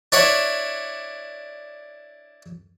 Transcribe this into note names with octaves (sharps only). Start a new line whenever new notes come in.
D4 E4 C#5 F#5